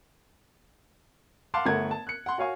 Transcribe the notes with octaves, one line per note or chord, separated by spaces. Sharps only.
F5 F#5 A5 C6 D6
G1 A3 A#4 F#5 G#6
A5
F#6 C#7
F#5 C6
F#4 C#5 F5 G#5 C#6